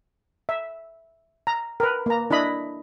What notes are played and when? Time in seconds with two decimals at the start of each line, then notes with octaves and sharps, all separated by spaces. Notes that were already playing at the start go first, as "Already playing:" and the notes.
0.49 E5
1.47 A#5
1.80 A#4 B4
2.06 A#3 A#5
2.31 D4 E4 D#5 B5